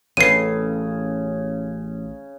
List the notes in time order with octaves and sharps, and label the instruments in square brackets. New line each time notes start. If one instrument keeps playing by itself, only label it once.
[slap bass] A1 [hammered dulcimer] C#3 [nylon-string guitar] C#4 A4 B4 [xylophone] C7 D#7